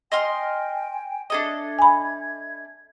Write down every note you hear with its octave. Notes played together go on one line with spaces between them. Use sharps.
D#5 G5 G#5 C6 F6
D4 A4 D#5 E5 G#6
G#5 B5